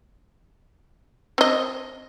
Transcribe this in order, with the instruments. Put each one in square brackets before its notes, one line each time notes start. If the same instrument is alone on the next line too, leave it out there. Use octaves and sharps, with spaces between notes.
[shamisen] C4 D#5